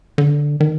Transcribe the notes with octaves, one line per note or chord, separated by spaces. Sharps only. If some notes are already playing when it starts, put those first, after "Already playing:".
D3
D#3